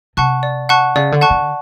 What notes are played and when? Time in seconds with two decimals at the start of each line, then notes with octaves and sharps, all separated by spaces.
0.17 C3 F#5 A5 C#6 F#6
0.43 D5
0.69 F#5 A5 C#6 F#6
0.96 C#3 D5
1.12 D3
1.21 F#5 A5 C#6 F#6
1.30 D3